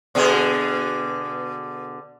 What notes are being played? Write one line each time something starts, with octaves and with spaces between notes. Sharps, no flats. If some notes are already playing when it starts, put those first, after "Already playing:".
B2 D3 G#4